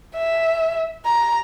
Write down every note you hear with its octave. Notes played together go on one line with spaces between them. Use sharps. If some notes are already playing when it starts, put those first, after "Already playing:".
E5
A#5